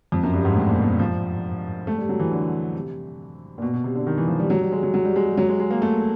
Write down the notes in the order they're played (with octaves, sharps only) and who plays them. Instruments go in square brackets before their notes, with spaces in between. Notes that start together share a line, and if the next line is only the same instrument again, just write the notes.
[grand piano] F2
F#2
G2
G#2
A2
A#2
B2
F3
A3
G3
F#3
E3
D3
C3
A#2
B2
B2
C3
D3
D#3
E3
F3
G3
F#3
G3
G#3
F#3
F#3
G3
G#3
G3
F#3
G#3
G#3
A#3
A3